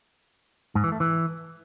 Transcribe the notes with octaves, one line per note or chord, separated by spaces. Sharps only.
G#2
E3
A3
E3